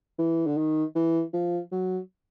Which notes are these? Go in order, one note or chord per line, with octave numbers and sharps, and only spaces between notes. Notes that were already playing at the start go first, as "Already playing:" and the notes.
E3
D3
D#3
E3
F3
F#3